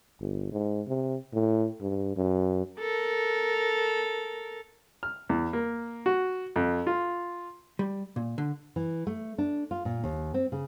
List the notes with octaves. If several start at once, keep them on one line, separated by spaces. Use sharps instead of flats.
G1
G#2
C3
A2
G2
F#2
A4 A#4
F6
E2
A#3
F#4
F2
F4
G3
A#2
D3
E3
A3
D4
F4
A#2
D#2
C4
C#3